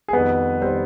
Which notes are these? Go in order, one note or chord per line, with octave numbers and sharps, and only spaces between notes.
G#4
F2 D#3 G3 B3 B4
D#3 G3 C4 C5